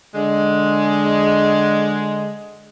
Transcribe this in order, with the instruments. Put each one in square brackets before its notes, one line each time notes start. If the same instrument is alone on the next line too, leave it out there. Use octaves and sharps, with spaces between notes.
[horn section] D3 G#3